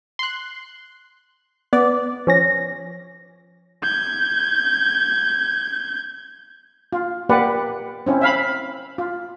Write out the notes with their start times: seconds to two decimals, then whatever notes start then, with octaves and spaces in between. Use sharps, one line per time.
0.19 C6 F#6
1.73 B3 D5
2.27 F3 C#4 A#6
3.83 G6 G#6
6.93 F4
7.29 A#3 G4 B4 D5 F#5
8.06 C4 C#4 E4
8.21 E5 F5 B5
8.98 F4